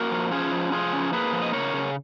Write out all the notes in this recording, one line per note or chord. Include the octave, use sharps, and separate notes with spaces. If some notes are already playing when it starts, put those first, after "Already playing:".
Already playing: A#3 F#4 A#4
F3
C#4 F4 G#4
F3
F3 F4 G#4
C#4
A#3 G#4 B4
F3
D#5
C#3 A#4 C#5
C#3